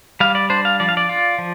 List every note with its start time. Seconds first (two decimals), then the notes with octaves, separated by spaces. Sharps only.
0.20 G3 F5
0.35 D5
0.50 D4 C5
0.65 F5
0.80 F3 D5
0.89 F5
0.97 D5
1.09 F4
1.38 F3